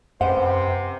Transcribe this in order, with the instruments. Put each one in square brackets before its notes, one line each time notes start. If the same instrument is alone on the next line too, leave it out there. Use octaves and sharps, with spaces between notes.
[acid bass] F#2 [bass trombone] C3 [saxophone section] G4 B4 C5 [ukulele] F#5